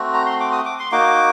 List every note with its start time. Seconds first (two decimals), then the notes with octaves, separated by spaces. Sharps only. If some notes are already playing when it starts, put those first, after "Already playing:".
Already playing: A3 C4 F#4
0.14 A#5
0.26 C6
0.40 D6
0.52 D#6
0.65 D6
0.80 C6
0.92 A#3 D#4 F#4 D6